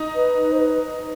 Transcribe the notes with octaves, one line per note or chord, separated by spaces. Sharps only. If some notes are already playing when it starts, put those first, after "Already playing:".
Already playing: D#4
B4
C5
B4